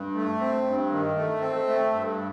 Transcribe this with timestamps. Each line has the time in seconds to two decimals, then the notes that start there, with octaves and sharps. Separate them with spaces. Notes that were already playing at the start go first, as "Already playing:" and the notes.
Already playing: G2
0.15 A3
0.40 C4
0.65 G2
0.91 D#3
1.16 A3
1.41 C4
1.67 A3
1.92 G2